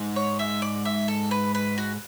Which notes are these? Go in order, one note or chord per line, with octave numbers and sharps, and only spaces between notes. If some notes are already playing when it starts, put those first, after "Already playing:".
Already playing: G#2
C#5
E5
D5
E5
A4
B4
B4
F#4